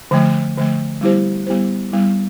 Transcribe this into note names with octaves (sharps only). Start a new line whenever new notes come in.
D3 F3 A3
D3 F3 A3
G3 B3 E4 G4 C5
G3 B3 E4 G4 C5
G3 B3 E4